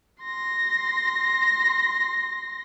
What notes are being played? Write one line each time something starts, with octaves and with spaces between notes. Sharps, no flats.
C6 A#6